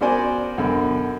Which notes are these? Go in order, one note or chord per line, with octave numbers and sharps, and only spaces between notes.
B3 F#4 A#4 C5 D5 G#5
F#2 B2 D3